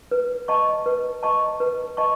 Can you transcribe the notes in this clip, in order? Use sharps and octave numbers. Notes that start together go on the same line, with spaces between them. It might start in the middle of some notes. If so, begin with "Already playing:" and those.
B4
D#5 A5 C#6
B4
D#5 A5 C#6
B4
D#5 A5 C#6